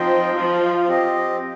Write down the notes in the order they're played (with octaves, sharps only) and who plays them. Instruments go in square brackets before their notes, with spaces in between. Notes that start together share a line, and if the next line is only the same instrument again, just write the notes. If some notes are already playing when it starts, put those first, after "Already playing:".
Already playing: [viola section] F3 [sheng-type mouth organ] C4 D#4 C5 D#5 G5
[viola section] F3 [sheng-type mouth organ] F4 C5 F5
[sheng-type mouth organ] C4 G4 D#5